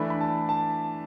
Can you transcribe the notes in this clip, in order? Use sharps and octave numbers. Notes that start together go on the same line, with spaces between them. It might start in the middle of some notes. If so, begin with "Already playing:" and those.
Already playing: E3 A3 D4 B5
B5
A5
A5